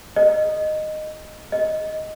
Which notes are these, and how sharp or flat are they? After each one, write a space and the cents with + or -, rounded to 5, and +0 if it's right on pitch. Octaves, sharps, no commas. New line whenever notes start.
D#5 -10
D#5 +10